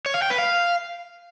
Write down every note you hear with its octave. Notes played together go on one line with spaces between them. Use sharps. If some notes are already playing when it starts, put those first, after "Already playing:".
C#5
F5
G5
B4
F5